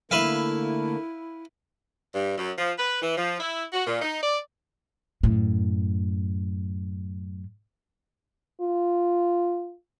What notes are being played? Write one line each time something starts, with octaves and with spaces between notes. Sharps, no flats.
D3 A3 A#3 E4 B4 E5 F5
G2
F#2
F3
B4
E3
F3
E4
F#4
A#2
D#4
D5
F#2 A2
F4